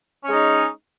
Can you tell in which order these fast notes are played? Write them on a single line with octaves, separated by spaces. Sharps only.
C#4 G#3 D#4